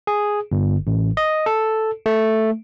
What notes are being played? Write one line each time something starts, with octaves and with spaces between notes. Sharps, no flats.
G#4
G1
A1
D#5
A4
A3